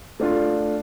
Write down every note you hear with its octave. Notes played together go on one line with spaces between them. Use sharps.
A3 D4 F4